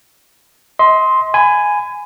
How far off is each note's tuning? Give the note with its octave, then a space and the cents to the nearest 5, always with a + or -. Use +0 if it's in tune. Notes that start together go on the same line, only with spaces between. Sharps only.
D#5 +35 C6 +0
G#5 +0 B5 +30